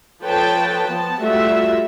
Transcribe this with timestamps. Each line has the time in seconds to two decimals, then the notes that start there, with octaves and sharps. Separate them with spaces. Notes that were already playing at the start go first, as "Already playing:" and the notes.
0.22 F3 A4 B4 C#5 G5 A5
0.86 F3 B3 A5
1.21 G3 A3 F4 F#4 E5